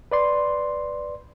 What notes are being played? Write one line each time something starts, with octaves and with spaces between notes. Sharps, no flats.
B4 D5 C6